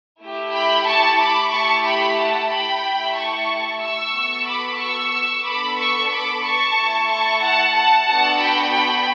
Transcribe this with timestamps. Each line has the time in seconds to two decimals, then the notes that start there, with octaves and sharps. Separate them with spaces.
0.21 A3 E4 G4
0.54 G5 B5
0.87 A5 C#6
1.19 B5 D6
1.52 A3 E4 G4 A5 C#6
1.85 G5 B5
2.18 F#5 A5
2.51 G5 B5
2.83 A3 E4 G4
3.16 A5 C#6
3.81 C#6 E6
4.14 B3 F#4 A4
4.47 B5 D6
4.80 C#6 E6
5.45 B3 D4 A4 B5 D6
5.78 C#6 E6
6.12 B5 D6
6.44 A5 C#6
6.77 A3 E4 A4
7.09 A5 C#6
7.42 F#5 A5
7.74 F#5 A5
8.08 B3 D4 F#4 A4 F#5 A5
8.40 G5 B5
8.73 G5 B5